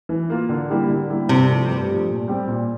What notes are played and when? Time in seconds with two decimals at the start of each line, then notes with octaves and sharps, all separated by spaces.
0.09 E3
0.30 A#3 F4
0.49 D3
0.70 G3 A#3 E4 G4
0.89 D3
1.09 G3 A#3 E4 G4
1.29 G2 C3
1.49 F3 A3
1.69 G2
1.89 F3 A3
2.09 A#2
2.28 G3 C4 G4
2.48 A#2